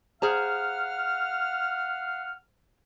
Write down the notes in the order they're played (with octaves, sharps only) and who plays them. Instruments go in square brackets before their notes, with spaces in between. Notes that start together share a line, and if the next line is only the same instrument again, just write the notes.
[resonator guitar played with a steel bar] G#4 C5 A#5 [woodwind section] F5 F#5 F6